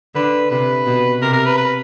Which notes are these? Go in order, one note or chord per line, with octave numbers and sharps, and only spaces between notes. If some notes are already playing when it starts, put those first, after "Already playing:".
D3 B4
C3 B4
B2
C3 A#4
A#4
B4
B4